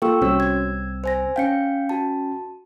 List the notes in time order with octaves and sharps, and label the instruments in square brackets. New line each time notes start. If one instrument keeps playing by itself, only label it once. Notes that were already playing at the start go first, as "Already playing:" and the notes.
[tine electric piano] A#3 F4 A4 [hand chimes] G5 C#6 E6
[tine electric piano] C2 C4 E6 [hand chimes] C#4 F#4 C#5
[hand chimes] G#6
C5 G#5 A#6
[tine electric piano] C#4 G5 [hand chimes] F5 G6 C#7
[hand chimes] F#4 A5